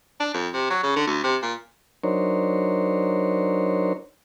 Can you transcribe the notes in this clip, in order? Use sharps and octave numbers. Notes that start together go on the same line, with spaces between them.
D4
F2
C3
F#3
C#3
D3
D2
C3
A#2
F#3 D4 D#4 A#4 C5 C#5